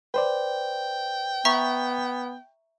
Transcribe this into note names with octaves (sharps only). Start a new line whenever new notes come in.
B4 C5 D5 G5
B3 E5 A#5 C#6